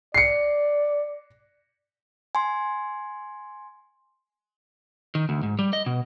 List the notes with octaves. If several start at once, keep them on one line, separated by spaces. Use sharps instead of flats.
D5 C7 C#7
G#5 C6
D#3
D2
G#2
G3
D#5
B2